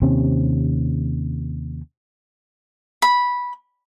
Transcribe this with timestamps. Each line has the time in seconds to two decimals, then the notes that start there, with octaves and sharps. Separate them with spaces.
0.02 D#2 C3 C4 C#4
3.02 B5